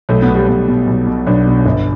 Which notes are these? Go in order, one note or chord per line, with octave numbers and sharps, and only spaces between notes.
B1 A3
B3
B2
G3
B1 B3
B2
B1
B2
B1 D4
B2
G1